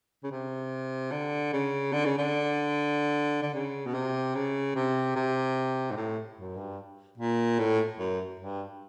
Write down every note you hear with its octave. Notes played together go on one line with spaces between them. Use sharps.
C#3
C3
D3
C#3
D3
C#3
D3
D3
C#3
B2
C3
C#3
C3
C3
G#2
A2
F#2
G2
A#2
A2
F#2
G2